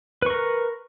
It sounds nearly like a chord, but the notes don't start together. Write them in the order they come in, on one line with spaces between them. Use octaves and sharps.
B4 C#6 A#4